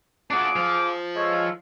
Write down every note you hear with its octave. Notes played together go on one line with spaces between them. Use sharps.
D4 F4 F#4 G#4 D6
F3
G#3 A4 C#5